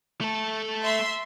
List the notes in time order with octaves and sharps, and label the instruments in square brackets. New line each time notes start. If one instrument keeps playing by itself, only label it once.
[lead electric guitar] A3 A4
[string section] E5 C6